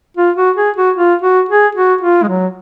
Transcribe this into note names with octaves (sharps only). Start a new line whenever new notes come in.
F4
F#4
G#4
F#4
F4
F#4
G#4
F#4
F4
G#3
F#3